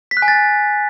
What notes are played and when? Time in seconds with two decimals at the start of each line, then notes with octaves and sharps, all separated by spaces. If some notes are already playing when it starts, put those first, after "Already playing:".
0.11 B6
0.17 F#6
0.22 G#5
0.28 A6